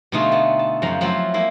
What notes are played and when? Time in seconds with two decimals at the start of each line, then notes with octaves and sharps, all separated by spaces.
0.12 B2 D3 A3 D#4 F4 G#4
0.32 B3 A5
0.59 A5
0.82 F#2 C#3 F3 A#5
1.01 F3 F#3 A3 C4 E4 F4
1.34 G#3 A#3 E4